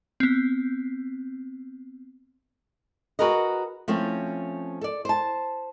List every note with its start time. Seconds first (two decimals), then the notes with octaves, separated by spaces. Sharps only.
0.20 B3 C4
3.19 F#4 G#4 A#4 B4 D#5
3.88 F3 A3 C4 C#4
4.81 A4 D5
5.05 C5 A5